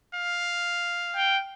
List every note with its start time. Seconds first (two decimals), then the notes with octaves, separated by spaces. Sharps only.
0.14 F5
1.16 G5